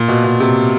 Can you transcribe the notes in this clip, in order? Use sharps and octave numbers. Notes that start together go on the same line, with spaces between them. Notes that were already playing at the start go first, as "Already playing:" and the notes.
Already playing: A#2
B2
B2
C3